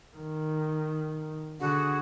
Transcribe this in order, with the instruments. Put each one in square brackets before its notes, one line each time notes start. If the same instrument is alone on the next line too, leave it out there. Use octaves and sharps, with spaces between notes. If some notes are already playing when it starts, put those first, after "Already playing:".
[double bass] D#3
[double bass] D3 [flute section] F#4 G#4 F#5